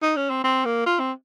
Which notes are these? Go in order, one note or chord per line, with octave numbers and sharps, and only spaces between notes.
D#4
C#4
C4
C4
A#3
F4
C4